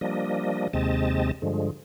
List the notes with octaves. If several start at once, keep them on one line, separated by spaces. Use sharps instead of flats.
F3 G3 A#3 D4 D#5
D#2 C3 G#3 C4 D#5 A5
G2 D3 F3 G#3